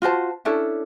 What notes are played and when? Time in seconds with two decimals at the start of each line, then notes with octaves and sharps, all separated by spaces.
0.02 F4 F#4 C5 A5
0.45 C#4 D4 E4 A4